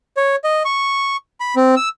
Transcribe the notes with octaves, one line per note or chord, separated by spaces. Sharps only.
C#5
D#5
C#6
B5
C4
E6